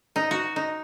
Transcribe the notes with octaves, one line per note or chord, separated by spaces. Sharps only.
D#4
F#4
D#4